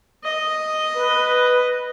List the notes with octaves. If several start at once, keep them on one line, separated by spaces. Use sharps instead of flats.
D#5
B4